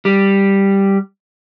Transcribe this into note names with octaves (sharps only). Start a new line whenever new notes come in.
G3